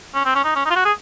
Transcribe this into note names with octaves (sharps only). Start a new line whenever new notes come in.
C#4
C4
C#4
D#4
C#4
D#4
F4
F#4
G#4